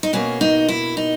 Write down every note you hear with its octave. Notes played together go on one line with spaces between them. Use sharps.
D#4
B2 A#3 C#4
D#4
E4
D#4